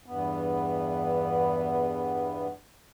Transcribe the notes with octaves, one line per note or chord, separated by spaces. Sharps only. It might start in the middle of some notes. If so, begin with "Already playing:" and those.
E2 G2 B3